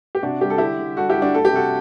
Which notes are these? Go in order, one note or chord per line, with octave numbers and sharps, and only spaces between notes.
G4
C3 D4 F#4
G3 G4
A4
D3 E4 G4
D3
G3 F#4 A4
E4 G4
G3
D4 F#4
A3 A4
G4
C3 F#4 A4